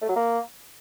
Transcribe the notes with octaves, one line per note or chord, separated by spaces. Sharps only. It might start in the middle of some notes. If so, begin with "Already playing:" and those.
A3
F#3
A#3